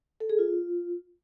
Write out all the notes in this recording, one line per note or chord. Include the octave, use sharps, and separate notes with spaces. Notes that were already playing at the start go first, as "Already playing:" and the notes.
A4
G#4
F4